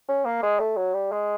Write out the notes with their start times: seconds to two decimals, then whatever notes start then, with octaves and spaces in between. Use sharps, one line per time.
0.08 C#4
0.25 A#3
0.43 G#3
0.59 A3
0.77 F#3
0.94 G3
1.12 G#3